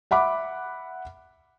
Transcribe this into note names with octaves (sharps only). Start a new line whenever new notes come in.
E5 F#5 B5 D6